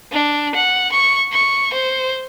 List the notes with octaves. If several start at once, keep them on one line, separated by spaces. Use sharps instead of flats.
D4
F#5
C#6
C#6
C5